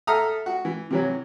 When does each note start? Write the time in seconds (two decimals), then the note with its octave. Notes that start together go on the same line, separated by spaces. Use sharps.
0.07 A4 E5 A#5 D#6 F6
0.46 F#4
0.65 E3
0.90 C3 E3 F#3